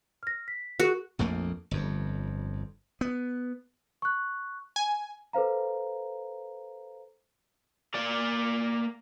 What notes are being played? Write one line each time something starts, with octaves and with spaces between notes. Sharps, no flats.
F6 A#6
B6
F#4 G#4 A#4
A#1 F2 A3 A#3
G1 F2
B3
C#6 F#6
G#5
A4 B4 C5 F5 A#5
A#3 D5